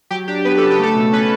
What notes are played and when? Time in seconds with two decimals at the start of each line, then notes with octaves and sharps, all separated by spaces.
0.11 F#3 G4
0.28 D4 G4
0.45 B3 B4
0.58 C#3 A4
0.70 G4
0.79 A3 A4
0.96 B2
1.12 C#4 B4